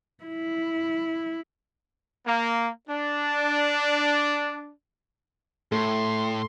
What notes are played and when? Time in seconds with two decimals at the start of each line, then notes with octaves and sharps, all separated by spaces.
0.24 E4
2.26 A#3
2.89 D4
5.72 A2 A3 C6